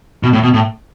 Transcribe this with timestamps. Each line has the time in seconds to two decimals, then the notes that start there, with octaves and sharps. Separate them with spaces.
0.23 B2
0.33 A2
0.43 B2
0.54 A2